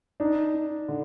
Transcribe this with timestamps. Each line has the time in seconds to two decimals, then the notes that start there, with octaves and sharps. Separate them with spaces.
0.20 D4 D#4
0.54 D#4
0.88 D3